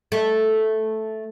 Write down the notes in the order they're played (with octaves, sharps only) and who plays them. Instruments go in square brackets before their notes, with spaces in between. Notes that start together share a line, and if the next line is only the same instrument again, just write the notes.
[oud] A3